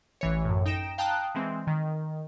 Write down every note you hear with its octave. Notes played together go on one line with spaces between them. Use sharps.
A1 E3 C#5
F#2 A2
D#4 G5 A#6 D7 E7
F5 G5 A5 A#5 D#6 F#6
E3 G#3 C4
D#3